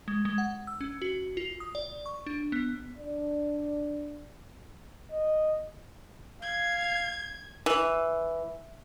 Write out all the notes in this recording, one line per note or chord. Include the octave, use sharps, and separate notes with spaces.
G#3
G#3
F#5
E6
C#4
F#4
F4
D#6
D5
C#6
D4
B3
D4 D5
D#5
F5 G#6
E3